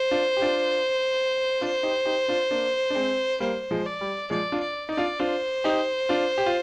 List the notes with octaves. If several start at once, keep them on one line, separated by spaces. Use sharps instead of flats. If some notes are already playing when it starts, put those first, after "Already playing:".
Already playing: C5
D4 F4
G4
D4 F4
D4 F4
D#4 G4
D#4 G4
D4 F4
A#3 D4
D4
G#3 C4
G3 A#3 C5
F3 G#3
D5
G3
F3 G#3 D5
D4 F4
D5
D#4 D5
D4 F4
D4 F4 C5
D#4 G4
D4 F4
G4
F4